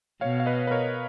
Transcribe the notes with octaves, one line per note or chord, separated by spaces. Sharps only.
B2 C#5 F5
F5
B4 D#5
B4
A#4 C#5